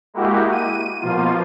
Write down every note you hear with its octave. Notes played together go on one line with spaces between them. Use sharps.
G#3 A#3 E4 F#4 G4
D#7
B2 F3 A#3 F4